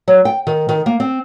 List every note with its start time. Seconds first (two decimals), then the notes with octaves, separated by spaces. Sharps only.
0.08 F#3
0.25 G5
0.47 D#3
0.69 D#3
0.86 A#3
1.00 C4